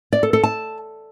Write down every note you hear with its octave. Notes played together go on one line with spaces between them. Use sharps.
D5
A4
A4
A5